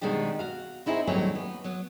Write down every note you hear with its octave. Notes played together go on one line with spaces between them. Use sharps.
B2 D#3 G#3 C4 D4 G4
F#4 F5
C4 D#4 E4 F#4 G#4 C5
D#2 A2 F#3 G3 C4 C#4
B3
F#3 B3